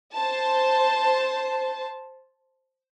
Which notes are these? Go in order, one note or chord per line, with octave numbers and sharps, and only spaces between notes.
C5 A5